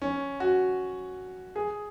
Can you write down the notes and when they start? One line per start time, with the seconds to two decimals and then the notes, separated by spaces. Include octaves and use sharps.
0.02 C#4
0.40 F#4
1.56 G#4